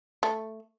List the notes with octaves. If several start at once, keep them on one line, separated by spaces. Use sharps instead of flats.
A3